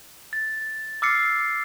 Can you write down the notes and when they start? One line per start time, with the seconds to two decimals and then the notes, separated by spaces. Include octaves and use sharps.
0.33 A6
1.02 D6 E6 F6 A6 C7 C#7